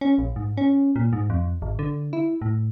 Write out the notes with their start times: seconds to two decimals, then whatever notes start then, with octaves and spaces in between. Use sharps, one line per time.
0.01 C#4
0.18 A#1
0.36 G#2
0.57 C#4
0.96 A#2
1.13 G#2
1.30 F2
1.62 G#1
1.79 D3
2.13 E4
2.42 A2